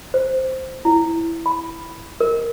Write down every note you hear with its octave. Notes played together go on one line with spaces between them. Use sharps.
C5
E4
B5
A#4